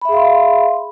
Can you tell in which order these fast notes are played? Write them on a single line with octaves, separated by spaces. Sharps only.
B5 E5 G#4 F5 C6